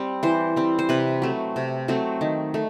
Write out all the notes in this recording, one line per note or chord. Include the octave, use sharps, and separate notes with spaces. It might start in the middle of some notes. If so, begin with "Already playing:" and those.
Already playing: G3 C4
E3 C5
G3 C4
C5
C3 B4
F#3 A3 C4
C3
F#3 A3 C4
D#3
A3